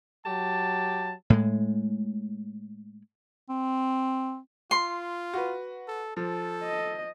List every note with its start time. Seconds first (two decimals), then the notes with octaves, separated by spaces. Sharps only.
0.25 F#3 G4 A5
1.30 A2 G#3
3.49 C4
4.71 F4 C6
5.34 F#4 B4
5.88 A4
6.17 F3 A4
6.63 D#5